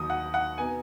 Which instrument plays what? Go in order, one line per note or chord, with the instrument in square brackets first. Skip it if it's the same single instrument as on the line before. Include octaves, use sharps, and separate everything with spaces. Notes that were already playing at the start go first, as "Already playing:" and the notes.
Already playing: [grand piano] D#2 D#3 F#3 [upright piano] D#6
[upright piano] F#5
F#5
[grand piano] B2 B3 D#4 [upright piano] G#5